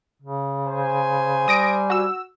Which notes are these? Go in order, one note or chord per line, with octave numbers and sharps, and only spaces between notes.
C#3
C5 G#5
G3 D#6 A#6 D7
F#4 E6